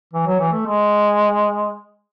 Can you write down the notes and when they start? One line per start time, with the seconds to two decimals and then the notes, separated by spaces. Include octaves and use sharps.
0.13 E3
0.26 F#3
0.40 E3
0.52 A3
0.66 G#3